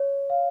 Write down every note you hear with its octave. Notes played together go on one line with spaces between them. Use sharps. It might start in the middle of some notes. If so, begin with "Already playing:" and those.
Already playing: C#5
F5